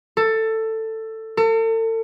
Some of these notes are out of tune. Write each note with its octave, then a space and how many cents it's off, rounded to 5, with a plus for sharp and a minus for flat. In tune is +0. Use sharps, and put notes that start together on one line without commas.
A4 +15
A4 +40